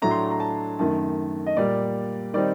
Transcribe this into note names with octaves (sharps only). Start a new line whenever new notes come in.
A2 F#3 A3 D4 A#5
C6
A#5
A5
F#2 D#3 A3 A5
D#5
A#2 G3 A#3 D5
D#3 G3 C4 D#4 D5